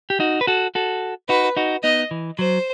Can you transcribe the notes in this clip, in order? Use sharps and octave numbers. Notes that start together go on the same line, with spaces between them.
G4
D#4 F#4
B4
F#4 A4
F#4 A4
D#4 F#4 B4
D#4 F#4
B3 D#4 D#5
E3
F#3 C5